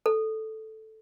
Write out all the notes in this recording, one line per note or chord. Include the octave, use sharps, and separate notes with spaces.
A4